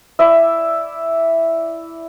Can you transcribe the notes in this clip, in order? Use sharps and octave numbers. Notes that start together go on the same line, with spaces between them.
E4 D5 E5